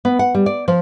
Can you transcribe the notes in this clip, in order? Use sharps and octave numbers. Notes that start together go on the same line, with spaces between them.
B3
F#5
G3
D5
F3